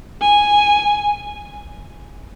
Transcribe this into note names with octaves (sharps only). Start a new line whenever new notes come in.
G#5